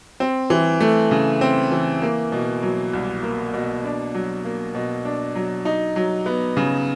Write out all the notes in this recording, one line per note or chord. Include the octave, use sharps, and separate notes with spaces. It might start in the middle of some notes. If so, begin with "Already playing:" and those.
C4
E3
A3
C#3
C4
E3
A#3
B2
F#3
C2
A#3
B2
D4
F#3
A#3
B2
D4
F#3
D#4
F#3
B3
C#3